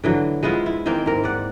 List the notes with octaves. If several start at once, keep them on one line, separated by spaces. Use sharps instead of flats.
D3 E3 F#3
G#3 B3 E4 F4
E4
D#3 E3 A#3 C4
G#2 A#4
G#2 D5 F#5